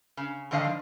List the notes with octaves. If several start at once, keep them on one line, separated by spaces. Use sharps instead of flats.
C#3
G#2 D3 D#3 D#5 F5 A5
F3